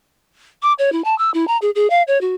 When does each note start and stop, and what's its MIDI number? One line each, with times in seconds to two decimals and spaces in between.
0.62 0.73 86
0.79 0.92 73
0.92 1.04 64
1.04 1.17 81
1.18 1.31 88
1.34 1.47 64
1.48 1.57 82
1.62 1.70 68
1.75 1.89 68
1.90 2.02 77
2.07 2.20 73
2.21 2.35 66